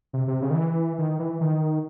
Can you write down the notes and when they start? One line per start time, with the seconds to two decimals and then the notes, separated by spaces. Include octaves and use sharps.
0.13 C3
0.27 C3
0.42 C#3
0.50 D#3
0.55 E3
0.98 D#3
1.19 E3
1.41 D#3